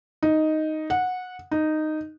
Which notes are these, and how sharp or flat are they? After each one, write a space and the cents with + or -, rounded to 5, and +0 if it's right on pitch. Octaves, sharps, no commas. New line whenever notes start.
D#4 +0
F#5 -15
D#4 -10